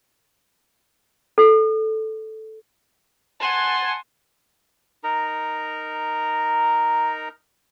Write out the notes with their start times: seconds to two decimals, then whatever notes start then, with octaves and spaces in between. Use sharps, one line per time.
1.38 A4
3.40 F#5 G#5 A5 C6
5.04 D#4 A#4 A#5